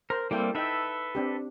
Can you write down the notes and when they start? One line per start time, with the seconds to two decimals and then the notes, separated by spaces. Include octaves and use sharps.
0.10 A#4 C5
0.31 G3 A#3 C4 E4 A4 G5
0.55 D#4 A4 B4 E5 G5
1.15 C4 D4 G4